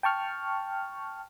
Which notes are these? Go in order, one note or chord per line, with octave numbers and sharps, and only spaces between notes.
G5 A5 C#6 F6